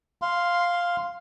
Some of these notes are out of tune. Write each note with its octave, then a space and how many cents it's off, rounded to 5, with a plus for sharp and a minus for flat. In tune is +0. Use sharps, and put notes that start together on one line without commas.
F5 +0 C6 +0